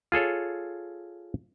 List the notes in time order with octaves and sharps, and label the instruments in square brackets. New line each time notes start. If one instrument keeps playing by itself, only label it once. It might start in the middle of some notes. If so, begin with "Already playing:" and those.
[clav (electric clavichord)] F4 G#4 A4 C#5